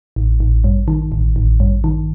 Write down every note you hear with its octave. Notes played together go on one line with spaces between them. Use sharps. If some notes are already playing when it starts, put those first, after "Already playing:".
A1
A1
G2
D#3
A1
A1
G2
D#3